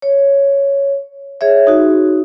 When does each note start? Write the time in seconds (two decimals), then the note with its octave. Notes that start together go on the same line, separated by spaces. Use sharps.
0.02 C#5
1.41 G#4 C#5 E5
1.67 D#4 F#4